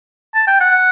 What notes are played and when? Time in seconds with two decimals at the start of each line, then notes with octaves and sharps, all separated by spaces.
0.35 A5
0.47 G5
0.60 F#5